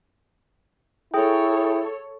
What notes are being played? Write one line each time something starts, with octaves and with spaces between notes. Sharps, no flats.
E4 G#4 A4 C#5 G5